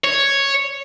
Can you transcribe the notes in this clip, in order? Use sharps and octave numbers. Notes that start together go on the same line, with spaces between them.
C#5